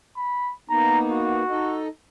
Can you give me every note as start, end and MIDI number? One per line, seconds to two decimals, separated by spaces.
0.17 0.52 83
0.70 1.43 58
0.70 1.43 59
0.70 1.43 63
0.70 0.99 82
1.10 1.82 66
1.50 1.88 63
1.50 1.88 69
1.50 1.88 75